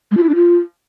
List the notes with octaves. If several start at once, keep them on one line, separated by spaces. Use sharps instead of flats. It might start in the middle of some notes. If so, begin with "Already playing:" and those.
G#3
F4
E4
D4
F4